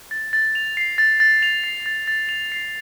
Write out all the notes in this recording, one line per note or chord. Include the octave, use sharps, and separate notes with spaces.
A6
A6
F7
C7
A6
A6
F7
C7
A6
A6
F7
C7